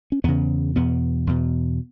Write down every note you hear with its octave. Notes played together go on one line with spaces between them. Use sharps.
C#4
E2 C#3 B3
E2 B2 B3
E2 B2